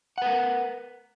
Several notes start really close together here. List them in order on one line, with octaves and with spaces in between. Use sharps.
F#5 B4 A#4